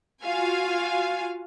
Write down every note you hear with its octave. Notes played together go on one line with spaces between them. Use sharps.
F4 F#4 F5 G#5